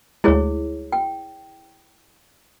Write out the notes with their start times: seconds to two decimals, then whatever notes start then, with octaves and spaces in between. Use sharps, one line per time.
0.24 D2 G#3 E4 G#4 C#5
0.92 G5